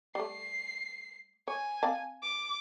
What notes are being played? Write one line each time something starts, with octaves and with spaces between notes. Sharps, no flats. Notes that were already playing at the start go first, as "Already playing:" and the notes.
G3 A3 C7
C#5 G#5
C4 F5 A5
D6